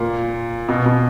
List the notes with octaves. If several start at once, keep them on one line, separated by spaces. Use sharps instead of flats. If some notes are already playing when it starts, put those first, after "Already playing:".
Already playing: A#2
B2
B2